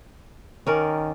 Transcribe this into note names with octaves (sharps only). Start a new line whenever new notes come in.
D#3 C#4 A#4 D5